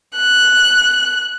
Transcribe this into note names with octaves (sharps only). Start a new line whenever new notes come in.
F#6